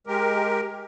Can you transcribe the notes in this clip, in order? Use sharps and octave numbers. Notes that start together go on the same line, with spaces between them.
G#3 G4 A#4